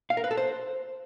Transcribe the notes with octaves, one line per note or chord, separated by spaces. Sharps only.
F5
A#4
B4
A4
C5